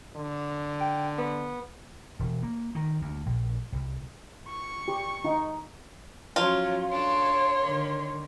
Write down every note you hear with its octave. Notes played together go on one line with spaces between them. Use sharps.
D3
G5
B3
E1
A#3
D#3
D2
A#1
C2
C#6
G4
D#4
F3 F#3 C#4 F4
D4 A4 C#5 C6
D3 D#3